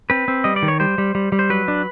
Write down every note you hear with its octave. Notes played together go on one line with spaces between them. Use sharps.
C4 B4
C4
G3 D#5
D5
D#3
C#5
G3 C5
G3
G3
G3
C5
F#3 B4
D4